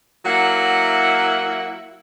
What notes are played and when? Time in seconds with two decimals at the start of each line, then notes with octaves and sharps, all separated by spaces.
0.25 F#3 A#3 E4 F#5